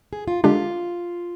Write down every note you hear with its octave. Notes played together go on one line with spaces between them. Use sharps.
G#4
F4
D3 G#3 D4 F4 G4